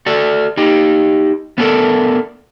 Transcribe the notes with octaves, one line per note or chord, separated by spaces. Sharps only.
F#4 A4 D5
D#4 G4
B3 C#4 D4 E4 A4 A#4